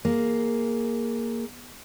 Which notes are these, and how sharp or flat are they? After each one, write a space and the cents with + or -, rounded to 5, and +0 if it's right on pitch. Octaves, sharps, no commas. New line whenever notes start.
A#3 +0 G#4 +5